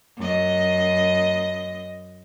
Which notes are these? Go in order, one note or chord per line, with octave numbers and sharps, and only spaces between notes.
F#2 D#5